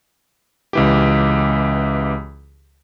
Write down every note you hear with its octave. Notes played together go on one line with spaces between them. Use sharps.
C#2 E3 G4